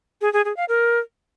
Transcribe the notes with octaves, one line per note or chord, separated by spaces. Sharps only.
G#4
G#4
G#4
F5
A#4